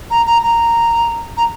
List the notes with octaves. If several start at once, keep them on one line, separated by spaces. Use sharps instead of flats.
A#5
A#5
A#5
A#5